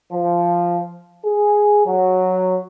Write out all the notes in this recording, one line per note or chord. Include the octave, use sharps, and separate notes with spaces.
F3
G#4
F#3